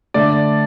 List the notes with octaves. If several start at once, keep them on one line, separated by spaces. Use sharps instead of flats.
D3 A3 D5